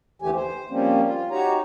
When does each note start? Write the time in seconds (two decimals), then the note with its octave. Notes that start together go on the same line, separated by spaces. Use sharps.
0.22 D#2 D3 E3 A3 G4 G#5
0.34 C5
0.70 F3 G3 A#3 C4 C#4
1.02 F4
1.31 D#4 F#4 G4 C#5 A#5